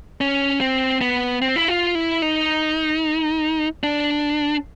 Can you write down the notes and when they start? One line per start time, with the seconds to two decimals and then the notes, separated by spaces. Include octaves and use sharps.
0.21 C#4
0.61 C4
1.01 B3
1.42 C4
1.56 E4
1.68 F4
1.95 E4
2.22 D#4
3.83 D4